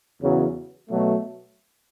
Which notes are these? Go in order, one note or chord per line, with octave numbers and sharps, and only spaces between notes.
E2 C#3 F#3
B2 F#3 A3